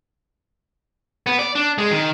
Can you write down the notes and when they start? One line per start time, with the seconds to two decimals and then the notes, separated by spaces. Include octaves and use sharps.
1.27 B3
1.39 D5
1.55 D4
1.78 G#3
1.91 D#3